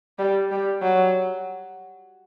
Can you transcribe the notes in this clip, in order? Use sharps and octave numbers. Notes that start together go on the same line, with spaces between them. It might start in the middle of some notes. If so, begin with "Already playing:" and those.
G3
G3
F#3